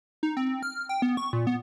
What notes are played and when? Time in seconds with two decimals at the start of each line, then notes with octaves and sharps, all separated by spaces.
0.23 D#4
0.37 C4
0.63 F6
0.89 G5
1.02 B3
1.17 C#6
1.33 A#2
1.47 B3